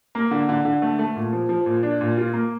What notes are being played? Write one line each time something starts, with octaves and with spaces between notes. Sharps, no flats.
A#3
D3
D3
D3
A3
A3
A#2
F3
F3
A#2
D4
A#2
F4
A#3